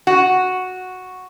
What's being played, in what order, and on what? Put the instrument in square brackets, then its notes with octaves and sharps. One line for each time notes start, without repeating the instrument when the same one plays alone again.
[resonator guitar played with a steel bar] F#4